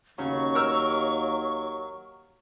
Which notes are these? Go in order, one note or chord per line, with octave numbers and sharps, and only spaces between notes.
D#2 C#3 F#3 C#6
A#4 E6